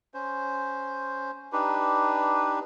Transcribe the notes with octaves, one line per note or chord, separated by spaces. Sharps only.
C#4 C5
D4 D#4 G4 B4